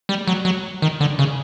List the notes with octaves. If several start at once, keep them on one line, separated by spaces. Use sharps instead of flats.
G3
F#3
F#3
D#3
D3
C#3